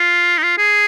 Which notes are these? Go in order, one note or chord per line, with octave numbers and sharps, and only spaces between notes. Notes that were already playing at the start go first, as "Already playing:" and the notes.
Already playing: F4
D#4
F4
G#4